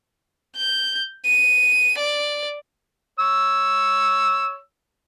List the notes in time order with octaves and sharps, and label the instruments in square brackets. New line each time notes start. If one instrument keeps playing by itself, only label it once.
[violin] G6
D#7
D5
[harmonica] C#5 E6